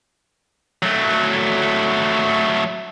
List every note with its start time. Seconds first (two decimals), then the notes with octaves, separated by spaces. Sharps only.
0.83 F#3 A3